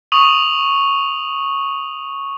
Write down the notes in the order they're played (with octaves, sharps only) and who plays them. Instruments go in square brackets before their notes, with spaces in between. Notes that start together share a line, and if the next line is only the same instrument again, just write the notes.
[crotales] C#6 D#6 D#7 F7 F#7